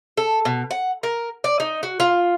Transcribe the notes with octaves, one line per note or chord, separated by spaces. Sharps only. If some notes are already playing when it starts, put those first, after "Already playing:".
A4
B2
F#5
A#4
D5
D#4
F#4
F4